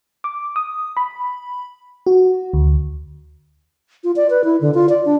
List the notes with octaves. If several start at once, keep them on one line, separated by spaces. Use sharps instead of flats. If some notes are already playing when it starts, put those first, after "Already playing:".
D6
D#6
B5
F#4
D2
F4
D5
B4
E4
D3
F4
D5
D4